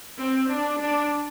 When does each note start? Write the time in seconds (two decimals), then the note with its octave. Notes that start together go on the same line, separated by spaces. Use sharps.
0.18 C4
0.49 D4
0.79 D4